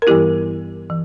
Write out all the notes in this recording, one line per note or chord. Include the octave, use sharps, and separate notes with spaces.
A#4
G2 E3 G3 B3 E4 G4
E3